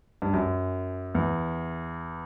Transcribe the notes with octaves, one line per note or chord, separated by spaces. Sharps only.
G2
F#2
E2